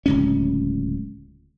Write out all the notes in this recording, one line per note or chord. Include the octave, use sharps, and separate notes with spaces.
D1 C#2 C#4